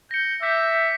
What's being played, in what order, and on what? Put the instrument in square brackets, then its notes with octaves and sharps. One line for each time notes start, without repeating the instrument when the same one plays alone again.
[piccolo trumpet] G6 [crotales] A#6 C#7
[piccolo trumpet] E5 [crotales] D6 G6 B6